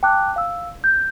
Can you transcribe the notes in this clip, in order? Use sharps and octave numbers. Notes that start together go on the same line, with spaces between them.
G5 A5 D6 F#6
F5 E6
G6